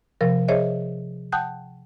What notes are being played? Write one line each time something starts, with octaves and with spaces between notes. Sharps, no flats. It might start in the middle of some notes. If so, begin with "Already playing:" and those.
C3 F3 A#4
G#4 C5 C#5 D#5 E5
F#5 G5 A5 D#6 F#6 G6